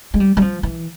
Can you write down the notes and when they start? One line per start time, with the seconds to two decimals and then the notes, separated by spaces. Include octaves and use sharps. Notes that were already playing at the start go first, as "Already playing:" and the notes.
0.14 G#3
0.20 G3
0.37 G3
0.42 F3
0.63 E3